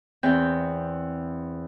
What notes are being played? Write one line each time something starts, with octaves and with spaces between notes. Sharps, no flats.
E2 C4 G5